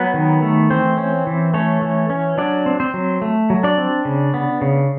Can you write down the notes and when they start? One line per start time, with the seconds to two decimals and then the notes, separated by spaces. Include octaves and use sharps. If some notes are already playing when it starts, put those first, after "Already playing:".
Already playing: F#3 B3 B4
0.14 D#3
0.42 A3
0.70 E3 C4 C5
0.98 C#4
1.27 E3
1.54 A3 C#4 C#5
1.82 E3
2.10 C#4
2.38 F#3 D4 D5
2.66 C4
2.80 C4 C5
2.94 F#3
3.22 A3
3.50 F#3
3.63 D4 D5
3.78 C4
4.05 C#3
4.34 B3
4.61 C#3